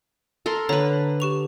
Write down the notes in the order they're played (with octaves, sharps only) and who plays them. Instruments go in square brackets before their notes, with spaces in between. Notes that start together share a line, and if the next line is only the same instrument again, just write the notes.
[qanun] A4 A#4 C6
[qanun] D3 B4 [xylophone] C#5 A#5
[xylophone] G4 C#6 F7